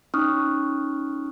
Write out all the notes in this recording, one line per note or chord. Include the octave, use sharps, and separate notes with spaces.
C#4 D#4 C#6 D#6 F6 F#6